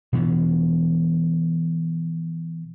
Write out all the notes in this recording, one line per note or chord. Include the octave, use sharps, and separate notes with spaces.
B2 E3 F3